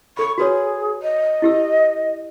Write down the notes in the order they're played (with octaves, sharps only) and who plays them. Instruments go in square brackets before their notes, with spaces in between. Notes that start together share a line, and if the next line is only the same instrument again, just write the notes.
[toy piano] A4 B5 [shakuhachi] C#6
[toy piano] F#4 B4 C#5 [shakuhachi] G#4
[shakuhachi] D#5
[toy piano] E4 G4 E6